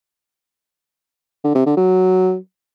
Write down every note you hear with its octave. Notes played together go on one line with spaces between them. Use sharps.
D3
C3
D3
F#3